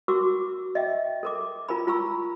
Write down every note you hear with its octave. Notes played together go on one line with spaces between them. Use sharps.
F#4 A#4 C#6 D6 E6
D#5 E5 G5
A4 A#4 D6
F4 A#4 G#5 B5
F4 G#5 A#5 B5 C#6 E6